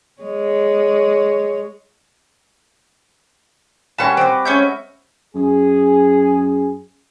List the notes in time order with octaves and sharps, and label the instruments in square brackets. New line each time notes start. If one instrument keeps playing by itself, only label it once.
[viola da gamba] G#3 C#5
[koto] A#2 G3 C#4 [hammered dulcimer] F#4 B4 [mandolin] A5 C#6
[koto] C4 C5 [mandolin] D5
[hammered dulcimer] G#3 E5 [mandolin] C#4 C#5 G6
[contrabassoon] F#2 [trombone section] G#4